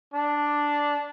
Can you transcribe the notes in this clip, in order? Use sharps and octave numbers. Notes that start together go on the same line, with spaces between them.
D4